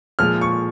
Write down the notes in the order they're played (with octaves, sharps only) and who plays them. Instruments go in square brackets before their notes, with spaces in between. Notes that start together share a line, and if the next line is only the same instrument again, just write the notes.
[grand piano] A#2 F3 G#3 F6
C#6